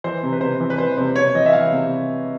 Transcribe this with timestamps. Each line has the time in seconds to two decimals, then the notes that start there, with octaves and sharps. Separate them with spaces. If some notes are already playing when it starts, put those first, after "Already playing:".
0.04 E3 C5
0.23 C3
0.33 B4
0.41 C3 C5
0.60 E3
0.70 B4
0.78 E3 C5
0.97 C3 C5
1.16 C3 C#5
1.35 E3 D#5
1.46 E5
1.53 E3 F5
1.71 C3